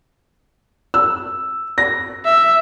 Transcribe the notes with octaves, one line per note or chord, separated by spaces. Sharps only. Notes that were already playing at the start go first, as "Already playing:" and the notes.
E6
A#6
E5